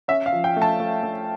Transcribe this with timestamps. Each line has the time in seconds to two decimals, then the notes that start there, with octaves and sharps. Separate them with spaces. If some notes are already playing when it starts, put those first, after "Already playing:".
0.08 C#4 E5
0.26 F5
0.33 F3
0.44 G5
0.56 A3
0.62 A5
0.80 A3
1.03 A3